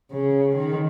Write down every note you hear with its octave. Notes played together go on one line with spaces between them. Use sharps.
C#3
D#3